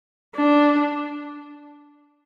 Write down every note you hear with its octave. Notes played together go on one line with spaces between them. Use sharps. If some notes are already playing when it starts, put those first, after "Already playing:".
D4